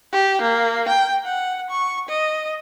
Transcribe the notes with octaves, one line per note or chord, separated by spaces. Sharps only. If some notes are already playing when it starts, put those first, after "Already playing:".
G4
A#3
G5
F#5
C#6
D#5